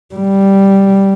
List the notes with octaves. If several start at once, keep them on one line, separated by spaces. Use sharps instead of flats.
G3